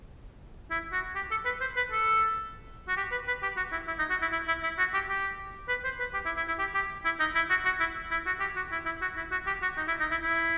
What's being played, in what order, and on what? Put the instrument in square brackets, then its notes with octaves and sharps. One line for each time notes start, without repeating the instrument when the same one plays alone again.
[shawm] E4
F#4
G4
A4
B4
C5
B4
A4
F#4
G4
B4
B4
G4
F#4
E4
E4
D#4
F#4
E4
E4
E4
E4
F#4
G4
G4
B4
C5
B4
G4
E4
E4
E4
G4
G4
E4
D#4
E4
F#4
F#4
E4
E4
F#4
G4
F#4
E4
E4
F#4
E4
F#4
G4
F#4
D#4
E4
D#4
E4
E4